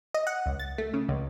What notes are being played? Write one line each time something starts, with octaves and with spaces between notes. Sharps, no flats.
D#5
F#5
C#2
A6
A3
C#3
C#2